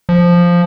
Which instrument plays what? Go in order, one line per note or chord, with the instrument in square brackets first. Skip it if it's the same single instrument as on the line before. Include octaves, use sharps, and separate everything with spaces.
[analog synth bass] F3